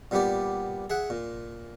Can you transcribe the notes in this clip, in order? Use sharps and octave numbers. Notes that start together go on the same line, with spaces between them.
A#2 G3 B3 G4 D5
G#4 E5 F#5
A#2